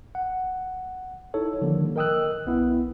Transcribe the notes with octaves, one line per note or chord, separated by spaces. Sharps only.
F#5
D#4 E4 A4 C#5
D3 D#3 F3 G3 A#3
A#4 D#5 G5 D#6 E6 F#6
B1 B3 E4